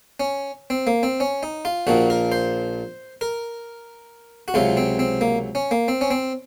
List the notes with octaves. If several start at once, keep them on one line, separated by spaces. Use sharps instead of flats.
C#4
C4
A#3
C4
C#4
D#4
F4
A#1 A#2 F3 A#3 F#4
A#4
C5
A#4
F#4
C#2 C3 F#3 F4
C4
C4
A#3
C#4
A#3
C4
C#4
C4